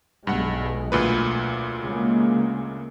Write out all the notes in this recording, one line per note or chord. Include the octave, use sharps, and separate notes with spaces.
B1 G2 B2 G#3 F#5
D2 A#2 B4
C#3 G#3 A#3